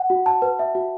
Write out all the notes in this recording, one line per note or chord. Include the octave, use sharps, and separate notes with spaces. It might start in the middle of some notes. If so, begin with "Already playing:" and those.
Already playing: F#5
F#4
A5
B4
E5
F#4